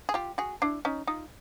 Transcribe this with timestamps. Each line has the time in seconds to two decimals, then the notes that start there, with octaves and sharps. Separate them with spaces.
0.09 G#4
0.14 F4 G4
0.38 F#4 G#4
0.62 D4 E4
0.85 C#4 D#4
1.07 D#4 F4